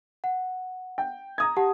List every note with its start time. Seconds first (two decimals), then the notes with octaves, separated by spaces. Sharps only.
0.24 F#5
0.98 G5
1.38 A#5 D#6 G#6
1.57 G4 F#5 A5